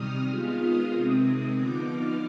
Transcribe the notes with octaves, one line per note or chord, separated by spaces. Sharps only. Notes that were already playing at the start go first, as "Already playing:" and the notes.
Already playing: C3 D#3 G3 D#6 F6
D#3 G#3 B3 F4 F6
D#6
C3 D#3 G#3 C4
D3 F3 B3 D#4 D6
F6